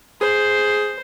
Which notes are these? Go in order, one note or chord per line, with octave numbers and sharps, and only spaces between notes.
G#4 C5